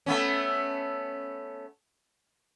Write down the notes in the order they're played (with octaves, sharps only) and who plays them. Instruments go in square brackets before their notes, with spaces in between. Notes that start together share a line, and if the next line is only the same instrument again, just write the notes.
[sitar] A3 B3 C#4